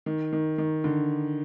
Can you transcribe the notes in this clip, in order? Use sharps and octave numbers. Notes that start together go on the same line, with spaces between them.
D#3
D#3
D#3
D3